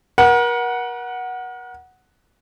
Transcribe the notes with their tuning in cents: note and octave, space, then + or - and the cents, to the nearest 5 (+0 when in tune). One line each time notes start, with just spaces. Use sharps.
A#4 +40 F#5 +0